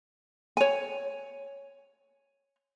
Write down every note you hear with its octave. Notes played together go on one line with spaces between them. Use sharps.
C#5 G#5